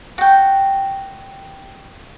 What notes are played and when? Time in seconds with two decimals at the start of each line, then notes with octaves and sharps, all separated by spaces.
0.18 F#4 G5